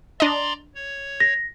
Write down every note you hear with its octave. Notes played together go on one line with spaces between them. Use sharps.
D4 D5 D#5 A#5 C6
C#5
A#6